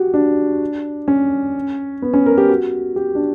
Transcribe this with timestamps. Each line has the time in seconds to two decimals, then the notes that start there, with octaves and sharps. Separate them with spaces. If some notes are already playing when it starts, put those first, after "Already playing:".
Already playing: F#4 G4
0.14 D4
1.08 C#4
2.02 B3
2.14 C#4
2.26 A#4
2.38 G4
2.49 F#4
2.96 G4
3.15 D4